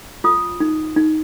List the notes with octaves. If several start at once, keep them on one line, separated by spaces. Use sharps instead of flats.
F4 D#6
D#4
D#4